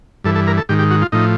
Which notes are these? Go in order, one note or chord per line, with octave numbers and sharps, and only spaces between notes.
G2 E3 A4
A4
A#4
A4
G#2 D#3 G4
G4
F#4
F4
A2 F3 D#4